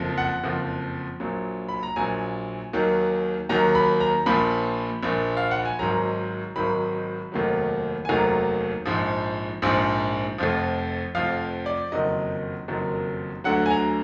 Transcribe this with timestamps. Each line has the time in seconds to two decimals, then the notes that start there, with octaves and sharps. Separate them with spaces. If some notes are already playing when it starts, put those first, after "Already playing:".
Already playing: F#1 F2 F3
0.18 F#5
0.44 F#1 F2 F3
1.20 A#1 A#2 F#3
1.69 B5
1.83 A#5
1.96 A#1 A#2 F#3 G#5
2.73 D#2 D#3 F#3
3.49 D#2 D#3 F#3 A#5
3.75 B5
4.00 A#5
4.26 A#1 A#2 F3 B5
5.03 A#1 A#2 F3
5.37 F5
5.51 F#5
5.65 G#5
5.79 G#1 G#2 D#3 F#3 A#5
6.56 G#1 G#2 D#3 F#3 B5
7.32 F1 D#2 D#3 F#3
8.05 G#5
8.09 F1 D#2 D#3 F#3 A#5
8.85 A#1 G#2 F3
9.62 A#1 G#2 F3
10.38 F1 F2 F3
11.15 F1 F2 F3 F5
11.66 D5
11.92 F#1 F2 D#3 F#3 D#5
12.68 F#1 F2 D#3 F#3
13.44 D2 D3 F#3 F#5
13.66 G#5
13.71 A#5